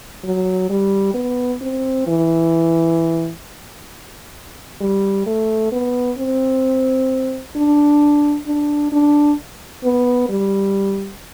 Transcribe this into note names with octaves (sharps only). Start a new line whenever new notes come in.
F#3
G3
B3
C4
E3
G3
A3
B3
C4
D4
D4
D4
B3
G3